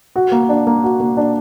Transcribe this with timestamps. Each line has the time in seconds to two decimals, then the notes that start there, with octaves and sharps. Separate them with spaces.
0.16 F#4
0.32 A#3
0.49 D4
0.67 A#3
0.84 F#4
1.00 A#3
1.17 D4